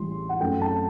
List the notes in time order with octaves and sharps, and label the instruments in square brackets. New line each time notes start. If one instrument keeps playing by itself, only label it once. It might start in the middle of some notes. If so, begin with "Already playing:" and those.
Already playing: [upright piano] A1 A2 E3 G3 C6
F#5
F#2 F#3 A3 G5
A5